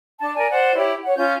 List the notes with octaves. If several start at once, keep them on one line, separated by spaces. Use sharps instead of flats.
D4 A5
A#4 D5 G#5
C5 D5 F#5
E4 G4 C#5
C#5 F#5
C#4 F4 G6